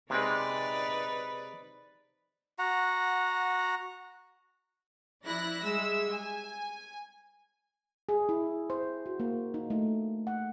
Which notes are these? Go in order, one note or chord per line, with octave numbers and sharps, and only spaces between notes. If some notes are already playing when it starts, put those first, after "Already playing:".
C3 G#3 D#4 B4 D5
F#4 F#5 A#5
F3 E4 D5 B5 F#6 A#6
G3 G#3 E5 E6
G#5
G#4
E4
C5
F#4
A#3
D#4
A3
F#5